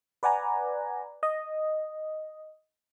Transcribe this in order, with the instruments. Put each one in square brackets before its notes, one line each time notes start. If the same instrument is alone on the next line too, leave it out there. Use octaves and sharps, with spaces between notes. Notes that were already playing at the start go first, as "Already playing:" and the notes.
[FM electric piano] B4 D5 F#5 G#5 A#5
D#5